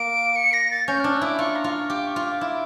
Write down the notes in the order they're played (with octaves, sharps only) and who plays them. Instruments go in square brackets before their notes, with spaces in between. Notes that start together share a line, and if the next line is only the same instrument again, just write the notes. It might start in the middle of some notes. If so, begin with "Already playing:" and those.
Already playing: [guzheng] A#3 [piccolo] D7
[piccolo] C#7
A#6
A6
[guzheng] C#4 [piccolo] G6
[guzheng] D4 [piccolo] F6
[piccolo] E6
[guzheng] E4 [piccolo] D6
[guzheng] F4 [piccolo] C#6
[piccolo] A#5
[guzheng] F4
[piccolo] C#6
[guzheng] G4 [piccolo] D6
[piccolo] C#6
[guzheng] F4
[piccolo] D6
[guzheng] E4